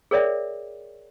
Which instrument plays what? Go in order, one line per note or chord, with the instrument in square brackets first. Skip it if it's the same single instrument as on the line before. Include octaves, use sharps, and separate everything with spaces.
[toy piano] G#4 A#4 C#5 D5 E5 G5